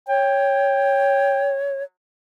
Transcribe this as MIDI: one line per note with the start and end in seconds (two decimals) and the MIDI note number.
0.08 1.83 73
0.08 1.53 79